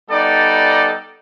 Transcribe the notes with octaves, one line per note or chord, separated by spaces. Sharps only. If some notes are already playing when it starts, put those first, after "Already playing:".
G3 B3 D#4 A4 D5